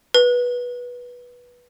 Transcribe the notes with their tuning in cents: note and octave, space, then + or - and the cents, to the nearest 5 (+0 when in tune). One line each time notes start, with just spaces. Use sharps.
B4 -15